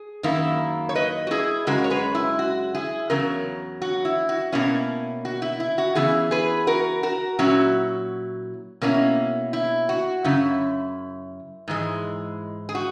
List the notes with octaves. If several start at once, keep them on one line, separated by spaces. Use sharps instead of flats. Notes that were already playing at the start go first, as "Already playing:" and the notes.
Already playing: G#4
F#2 D#3 A#3 E4
C#5
B4 D#5
F#4
E4 G#4
F#2 C#3 G#3 F#4 A#4
C#5
G#4 B4
E4
F#4
E4 G#4
E2 C#3 F#3 A#4
F#4
E4
F#4
B2 A#3 C#4 E4
F#4
E4
E4
F#4
C#3 E3 B3 E4 G#4
G#4 B4
F#4 A#4
F#4 A#4
A#2 F#3 C#4 E4 F#4
B2 A#3 C#4 E4
E4
F#4
F#2 C#3 E4
G#2 E3 G#3
G#4
F#4